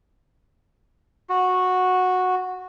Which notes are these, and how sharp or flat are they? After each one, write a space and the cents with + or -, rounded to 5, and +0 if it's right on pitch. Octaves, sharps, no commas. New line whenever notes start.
F#4 -10